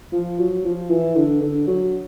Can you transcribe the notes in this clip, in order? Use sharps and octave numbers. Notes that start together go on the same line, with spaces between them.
F3
F#3
F3
E3
D3
D3
F#3